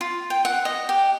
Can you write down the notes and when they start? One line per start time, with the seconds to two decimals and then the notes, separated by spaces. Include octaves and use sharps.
0.01 F4
0.30 G5
0.45 F#5
0.65 D#5
0.89 G4